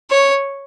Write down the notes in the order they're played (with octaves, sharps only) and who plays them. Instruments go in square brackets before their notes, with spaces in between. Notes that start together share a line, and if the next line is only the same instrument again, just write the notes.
[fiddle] C#5